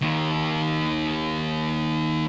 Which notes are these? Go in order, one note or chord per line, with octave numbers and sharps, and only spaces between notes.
D#2 D#3